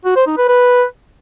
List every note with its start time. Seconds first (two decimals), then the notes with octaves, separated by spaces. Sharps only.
0.05 F#4
0.16 C5
0.27 D#4
0.37 B4
0.48 B4